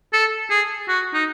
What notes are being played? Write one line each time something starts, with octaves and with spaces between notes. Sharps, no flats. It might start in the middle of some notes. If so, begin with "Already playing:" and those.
A4
G#4
F#4
D#4